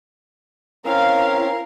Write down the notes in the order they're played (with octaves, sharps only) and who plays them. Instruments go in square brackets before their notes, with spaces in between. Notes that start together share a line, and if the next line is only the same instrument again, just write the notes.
[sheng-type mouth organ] C4 C#4 [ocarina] E4 [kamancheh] A#4 [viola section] F5